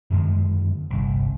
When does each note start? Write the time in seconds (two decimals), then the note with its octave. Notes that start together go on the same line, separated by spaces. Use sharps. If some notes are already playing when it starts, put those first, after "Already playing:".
0.10 F#2 D3 D#3 G#3
0.90 G1 C2